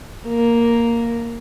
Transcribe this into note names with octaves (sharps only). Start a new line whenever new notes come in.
A#3